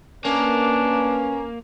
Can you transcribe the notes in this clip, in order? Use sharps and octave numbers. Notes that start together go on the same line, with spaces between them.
A#3 C#4 D4 B4